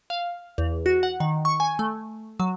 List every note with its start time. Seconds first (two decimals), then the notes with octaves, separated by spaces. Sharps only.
0.10 F5
0.58 E2
0.86 F#4
1.03 F#5
1.20 D#3
1.45 C#6
1.60 G#5
1.79 A3
2.40 F#3